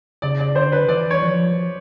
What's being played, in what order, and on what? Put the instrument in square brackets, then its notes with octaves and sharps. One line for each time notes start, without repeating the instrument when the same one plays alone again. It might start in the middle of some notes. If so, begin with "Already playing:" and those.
[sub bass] C#3 [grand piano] D5
[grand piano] D5
[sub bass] D3 [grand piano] C5
[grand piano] B4
[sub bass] E3 [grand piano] D5
[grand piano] C#5
[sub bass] F3